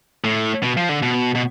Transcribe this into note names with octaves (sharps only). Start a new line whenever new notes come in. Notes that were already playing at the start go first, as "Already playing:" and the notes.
A2
B2
F3
D3
B2
B2